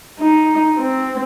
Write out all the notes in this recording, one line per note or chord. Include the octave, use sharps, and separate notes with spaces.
D#4
C4